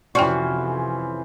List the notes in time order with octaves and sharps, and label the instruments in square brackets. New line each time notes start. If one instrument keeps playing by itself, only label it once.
[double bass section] F2 C3 [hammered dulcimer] E3 C#4 C5 [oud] F#4 [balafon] D5 G5